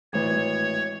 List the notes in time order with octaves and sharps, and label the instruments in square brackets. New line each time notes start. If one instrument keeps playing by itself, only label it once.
[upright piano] G#1 A2 E3 [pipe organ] C#5